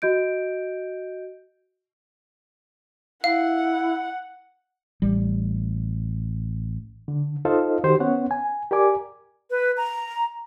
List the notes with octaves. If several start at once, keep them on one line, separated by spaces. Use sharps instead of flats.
F#4 D#5 G6 D7
E4 F5 F#5
A1 G3
D3
D#4 F4 A4 C5 D#5 F5
D#3 F#4 G4 C5
B3 C#4 C#5 F#5
G#5
G4 A#4 D5 G#5 D6
B4
A#5